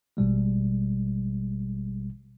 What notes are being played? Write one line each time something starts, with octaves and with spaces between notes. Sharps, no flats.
A1 B2 G3 G#3